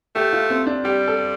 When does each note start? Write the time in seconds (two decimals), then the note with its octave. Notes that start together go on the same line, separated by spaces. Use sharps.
0.15 A3 G4
0.33 F4
0.50 C4
0.67 D4
0.85 G3 G4
1.08 A4